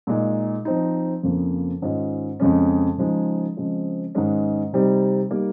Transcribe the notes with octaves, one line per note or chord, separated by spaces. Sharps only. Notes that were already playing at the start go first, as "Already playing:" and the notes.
A#2 G#3 D#4
F3 C4 D#4
F2 C#3 F3 A#3
G#2 D#3 G#3 C#4 F4
F2 C#3 G#3 C#4
C#3 F3 G#3 D#4
C#3 F3 G#3 C4
G#2 D#3 G#3 C#4
C3 G3 C4 D#4
G3 A#3 D#4 A#4